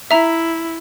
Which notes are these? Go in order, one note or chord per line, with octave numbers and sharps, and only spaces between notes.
E4 E5 A#5